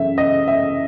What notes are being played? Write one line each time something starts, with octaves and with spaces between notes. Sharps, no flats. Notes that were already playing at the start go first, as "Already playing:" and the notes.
Already playing: F#2 C#3 E3 E5
D#5
E5